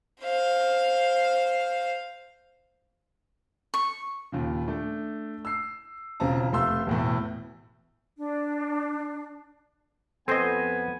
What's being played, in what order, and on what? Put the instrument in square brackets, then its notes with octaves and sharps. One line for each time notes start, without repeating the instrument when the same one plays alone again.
[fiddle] C5 F5
[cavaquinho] C#6
[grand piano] D#2 A#2 C#3
A3 D4
E6 C7
E1 C#3 C4 F4 A5 A#5
F1 A3 F5 C6 E6
E1 E2 A2
[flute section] D4
[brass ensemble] F2 B3 [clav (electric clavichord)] C4 C5 D#5 [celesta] A4 C7 [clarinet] G#5